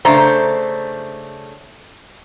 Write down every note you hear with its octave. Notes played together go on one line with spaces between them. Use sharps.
C#3 A3 D4 C5 A#5